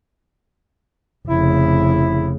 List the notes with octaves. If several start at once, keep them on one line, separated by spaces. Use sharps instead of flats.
F1 C#3 E4